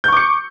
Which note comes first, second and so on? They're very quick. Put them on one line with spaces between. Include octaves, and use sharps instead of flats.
G6 C#6 D6 C#7